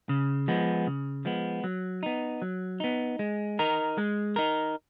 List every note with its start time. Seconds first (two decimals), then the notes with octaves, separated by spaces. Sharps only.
0.09 C#3
0.48 F3 G#3 B3
0.87 C#3
1.25 F3 G#3 B3
1.64 F#3
2.03 B3 D#4
2.42 F#3
2.80 B3 D#4
3.19 G#3
3.59 D#4 A#4
3.98 G#3
4.36 D#4 A#4